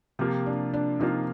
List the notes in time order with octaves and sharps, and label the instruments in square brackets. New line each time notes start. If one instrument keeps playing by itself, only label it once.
[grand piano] C3 F3 A#3 F4 [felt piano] G4
[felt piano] D4
D4
[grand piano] C3 F3 A#3 F4 [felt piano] D#4